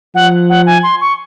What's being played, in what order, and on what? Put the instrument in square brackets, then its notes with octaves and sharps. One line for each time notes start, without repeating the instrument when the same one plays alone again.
[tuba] F3 [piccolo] F#5
[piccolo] F#5
G#5
C6
C#6